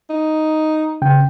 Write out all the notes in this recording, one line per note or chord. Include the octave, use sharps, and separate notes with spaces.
D#4
C#3 G5